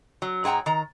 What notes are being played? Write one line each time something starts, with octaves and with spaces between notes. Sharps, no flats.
F#3
G#2 G#4 F#5 G5 A#5
D#3 A#5